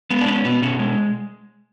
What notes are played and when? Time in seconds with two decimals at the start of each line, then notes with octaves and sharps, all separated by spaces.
0.10 G#3 B3
0.21 D4
0.27 B3 C#4
0.45 B2 B3
0.62 B2 C#4
0.79 G#3